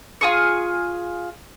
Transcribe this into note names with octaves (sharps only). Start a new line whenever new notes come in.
F4 G#4 C#6